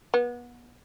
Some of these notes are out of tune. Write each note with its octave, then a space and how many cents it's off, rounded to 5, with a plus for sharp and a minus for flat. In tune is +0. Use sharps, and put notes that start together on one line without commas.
B3 -30